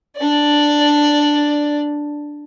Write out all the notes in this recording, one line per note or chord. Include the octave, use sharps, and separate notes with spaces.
D4 D5